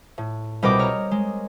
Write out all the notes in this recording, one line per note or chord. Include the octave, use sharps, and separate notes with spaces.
A2
C2 B2 A#4 D#5 G5 D6
C#5 A#5 F6
G#3